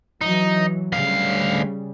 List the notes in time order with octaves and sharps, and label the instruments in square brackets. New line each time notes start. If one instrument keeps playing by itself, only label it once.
[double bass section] E3 F#3 [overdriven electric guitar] D#4
[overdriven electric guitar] D2 F5 [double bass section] C#3 G3